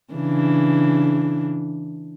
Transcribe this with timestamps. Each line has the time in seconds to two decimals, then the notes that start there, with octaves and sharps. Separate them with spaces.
0.14 C#3 E3 D4